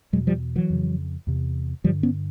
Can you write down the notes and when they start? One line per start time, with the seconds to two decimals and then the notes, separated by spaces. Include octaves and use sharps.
0.13 E2 B2 F#3 G#3
0.27 F3 G3
0.56 E3 F#3
0.70 F2 C#3
1.27 E2 C3
1.84 G2 D3 F3 G3
2.03 B3 C#4